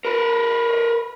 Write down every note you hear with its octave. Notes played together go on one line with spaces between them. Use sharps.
A#4 B4